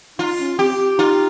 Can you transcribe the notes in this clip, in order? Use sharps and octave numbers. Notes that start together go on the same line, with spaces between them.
D#4 F4
C#4
C4 G4
D#4 F4